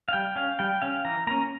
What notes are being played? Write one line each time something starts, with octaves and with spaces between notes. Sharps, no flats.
F5
G3 G5
C#4 F5
G3 G5
C#4 F5
E3 A#5
A#3 C#4 A#5